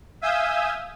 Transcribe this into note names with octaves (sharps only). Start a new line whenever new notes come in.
E5 F5 G#5 D#6 E6 G6